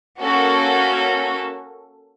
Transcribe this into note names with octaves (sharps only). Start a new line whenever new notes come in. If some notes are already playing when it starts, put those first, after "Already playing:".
A#3 C#4 F#4 A4